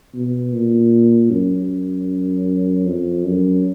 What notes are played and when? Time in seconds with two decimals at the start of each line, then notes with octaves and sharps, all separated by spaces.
0.15 B2
0.53 A#2
1.30 F#2
2.86 F2
3.25 F#2